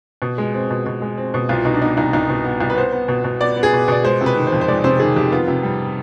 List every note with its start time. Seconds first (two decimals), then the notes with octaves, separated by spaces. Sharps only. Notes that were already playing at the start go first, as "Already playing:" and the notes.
0.22 B2
0.38 G#3
0.54 C4
0.70 B2
0.86 B2
1.02 G#3
1.18 C4
1.34 B2
1.49 C2 F4
1.65 B2 D#4
1.74 D4
1.81 B3 D#4
1.97 C2 D#4
2.13 C2 D#4
2.30 B2
2.44 B3
2.61 C2
2.70 B4
2.76 B3 C5
2.93 B3
3.08 B2
3.24 B2
3.40 B3 D5
3.57 B3
3.63 G#4
3.73 B2 B4
3.88 B2 D5
4.04 G#3 C5
4.21 C3
4.26 B4
4.36 D#3
4.47 C5
4.53 F2
4.61 C5
4.68 G#3 D5
4.84 C3 C5
5.00 D#3 G#4
5.16 F2 G4
5.32 B3 F4
5.48 C3
5.63 G3